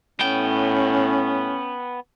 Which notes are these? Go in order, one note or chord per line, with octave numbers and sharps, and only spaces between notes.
A2 B3 C#4 G5